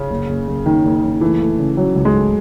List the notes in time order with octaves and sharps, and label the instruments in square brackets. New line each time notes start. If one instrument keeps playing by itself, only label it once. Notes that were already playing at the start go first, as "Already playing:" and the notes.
Already playing: [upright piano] C#3
[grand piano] F#1
F#1
F#1
[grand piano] F#1 [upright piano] D#3
[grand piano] F#1
F#1
[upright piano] E3 [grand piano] A3
[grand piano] A3
C#3
[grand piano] C#3 [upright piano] F#3
[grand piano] C#2
[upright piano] G#3
[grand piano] A3